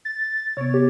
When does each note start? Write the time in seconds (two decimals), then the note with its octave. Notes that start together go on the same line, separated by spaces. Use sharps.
0.05 A6
0.57 C3 B3 C#5
0.74 G4